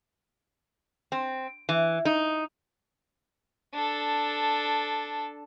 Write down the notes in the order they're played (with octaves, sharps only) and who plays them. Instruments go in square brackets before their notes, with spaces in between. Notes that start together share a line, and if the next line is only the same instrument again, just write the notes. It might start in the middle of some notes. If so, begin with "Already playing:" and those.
[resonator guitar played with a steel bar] C4
E3
D#4
[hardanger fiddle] D4 A4